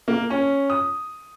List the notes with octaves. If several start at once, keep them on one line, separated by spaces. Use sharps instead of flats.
A#3
C#4
D#6